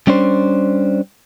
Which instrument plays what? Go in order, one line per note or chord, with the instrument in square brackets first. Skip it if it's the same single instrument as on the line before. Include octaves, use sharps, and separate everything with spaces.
[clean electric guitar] G3 C#4 D4 C5